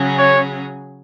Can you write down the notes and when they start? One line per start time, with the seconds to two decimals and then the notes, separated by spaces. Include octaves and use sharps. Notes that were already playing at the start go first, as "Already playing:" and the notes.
Already playing: C#3 F#3 C#4 G#4
0.18 C#5